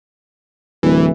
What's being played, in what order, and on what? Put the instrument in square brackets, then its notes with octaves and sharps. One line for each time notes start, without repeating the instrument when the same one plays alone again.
[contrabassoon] D1 [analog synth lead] E3